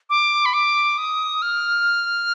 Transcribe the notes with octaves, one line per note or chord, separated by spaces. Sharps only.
D6
B5
D6
D#6
F6